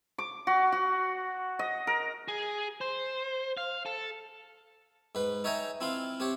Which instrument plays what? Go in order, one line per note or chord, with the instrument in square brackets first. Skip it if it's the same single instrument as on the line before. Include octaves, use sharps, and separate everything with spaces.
[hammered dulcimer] D6
F#4
F#4
D#5
A#4
[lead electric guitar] G#4
C5
F5
A4
[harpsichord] G#2 B4
D#4 C#5 E5 G5 G#5 A#5
C4 E4 F4 F5 C6
C4 G4 C#5